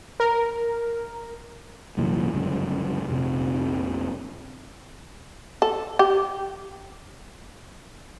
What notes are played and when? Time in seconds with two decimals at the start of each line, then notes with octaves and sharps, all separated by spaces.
0.20 A#4
1.97 C2 F#2 A#2 E3
2.32 G1 C#2 F#2
3.07 F1 A#1 C3
5.62 A4
5.99 G4